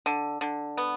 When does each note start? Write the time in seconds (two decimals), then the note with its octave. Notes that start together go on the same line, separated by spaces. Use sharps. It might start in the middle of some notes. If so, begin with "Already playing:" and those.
0.06 D3
0.41 D3
0.77 B3